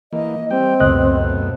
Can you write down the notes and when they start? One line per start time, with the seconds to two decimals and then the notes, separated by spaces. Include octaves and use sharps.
0.13 E3 A#3 D#5
0.51 G3 C4 G5
0.80 C#2 F#2 B2 A3 D#5 F#6